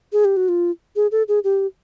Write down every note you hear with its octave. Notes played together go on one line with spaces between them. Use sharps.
G#4
G4
F#4
F4
G#4
A4
G#4
G4